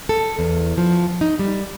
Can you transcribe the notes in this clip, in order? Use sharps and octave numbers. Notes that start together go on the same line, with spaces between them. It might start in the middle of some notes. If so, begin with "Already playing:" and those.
A4
E2
F3
D#4
G3